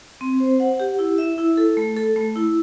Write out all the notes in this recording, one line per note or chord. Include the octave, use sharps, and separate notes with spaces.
C4
C5
F#5
G4
E4
E5
E4
A4
A3
A4
A3
E4